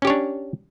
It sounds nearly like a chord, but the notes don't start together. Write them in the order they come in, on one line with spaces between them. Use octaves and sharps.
C#4 G4 C#5 D4